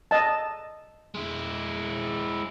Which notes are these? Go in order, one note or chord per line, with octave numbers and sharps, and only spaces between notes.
D#5 A5
G#3 E4